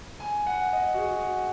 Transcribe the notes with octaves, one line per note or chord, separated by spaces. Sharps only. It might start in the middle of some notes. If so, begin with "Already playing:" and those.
G#5
F#5
D#5
F#4
G#4